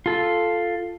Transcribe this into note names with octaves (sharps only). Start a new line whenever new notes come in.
F4 A4